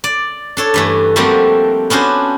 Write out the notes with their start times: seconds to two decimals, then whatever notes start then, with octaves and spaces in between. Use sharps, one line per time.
0.04 D5
0.57 D4 A4 C#5
0.74 G2 E3 A3
1.16 F3 G3 A3 A#3 C4 F#4
1.90 B3 C#4 D4 F#4 C5